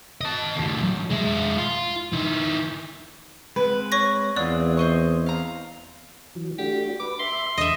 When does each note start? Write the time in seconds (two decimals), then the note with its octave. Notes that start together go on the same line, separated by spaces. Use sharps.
0.21 D#5 A5
0.56 D#2 A2
0.83 F#2
1.11 G#3 E4
1.58 F4
2.13 D#3 E4
3.56 G#3 C4 B4 F#5
3.92 C#5 C#6 A#6
4.36 E2 C4 F4 G#4 D5 F#5 F#6
4.77 C5 D#5 C#6
5.26 F5 A#5
6.35 E3 F#3
6.59 A3 D4 F#4 G4
7.00 B4 D6
7.20 E5 B5 C6
7.58 E2 D3 D#5 E5